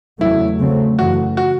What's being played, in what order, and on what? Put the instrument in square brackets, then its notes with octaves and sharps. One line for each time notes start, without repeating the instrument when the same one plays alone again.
[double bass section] E2 C#3 F#3 A3 [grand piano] E4
[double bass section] C#3 F#3 A3 C4
[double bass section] F#2 C#3 E3 A3 [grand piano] F#4
[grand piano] F#4